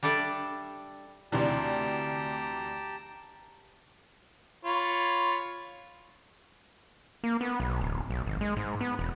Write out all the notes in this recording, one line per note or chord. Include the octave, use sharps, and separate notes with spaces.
G3 D4 A4 D5 E5
D2 C3 E3 D4 G4 A5 A#5
F4 C#5 B5
A#3
B3
B1
D1
B1
G#1
G#3
G#2
B3
E1